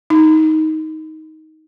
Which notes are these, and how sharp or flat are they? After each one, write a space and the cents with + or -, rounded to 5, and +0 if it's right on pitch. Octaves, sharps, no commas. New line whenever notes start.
D#4 +15